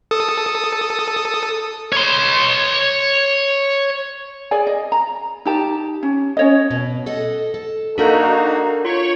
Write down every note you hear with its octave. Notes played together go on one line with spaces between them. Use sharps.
A4 D#6
C#5 C6
G#4 D5 G#5
D#5
A#5
D#4 G4 A5
C#4
C#4 C#5 D#5
B2
A4 D#5 F#5
A4
A#3 D4 D#4 F#4 A4 A#4
F4 C#5 C#6